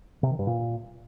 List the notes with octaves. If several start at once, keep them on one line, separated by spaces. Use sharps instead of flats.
C3
D#3
G2
A#2